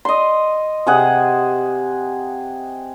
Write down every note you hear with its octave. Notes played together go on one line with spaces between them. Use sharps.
D#5 C6
C3 G#4 F#5